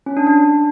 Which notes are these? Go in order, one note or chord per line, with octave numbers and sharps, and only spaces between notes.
C#4
D4
D4